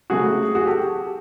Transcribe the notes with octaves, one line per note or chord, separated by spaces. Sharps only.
C#3 F#3 A3 C4 F#4 G#4
F#4 G#4
G4 A4